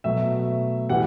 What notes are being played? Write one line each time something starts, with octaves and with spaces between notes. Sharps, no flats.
B2 F#3 A3 E5
A2 E3 G3 F#5